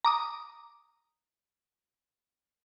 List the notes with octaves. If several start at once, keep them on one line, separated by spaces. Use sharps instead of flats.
A#5 D6 D#6